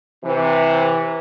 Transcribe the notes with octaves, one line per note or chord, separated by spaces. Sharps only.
C3 E3